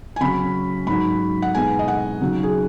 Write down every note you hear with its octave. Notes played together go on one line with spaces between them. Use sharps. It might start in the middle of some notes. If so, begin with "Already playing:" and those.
G#5
C#3 F#3 C#4 B5
G#2 F#3 D#4 B5
F#5
B2 G#3 B3 D#4 G#5
D#5
F#5
C#3 F#3 D#4
G#4